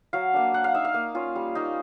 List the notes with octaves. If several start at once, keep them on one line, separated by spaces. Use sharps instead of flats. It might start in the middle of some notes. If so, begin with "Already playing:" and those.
F#3 F5
A#3 D4
A#3 F#5
F5
D#4 E5
F5
A#3
C#4 F4
G3
A#3 D#4